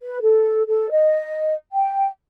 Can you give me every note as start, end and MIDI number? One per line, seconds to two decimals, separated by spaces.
0.01 0.21 71
0.22 0.63 69
0.67 0.89 69
0.91 1.53 75
1.72 2.08 79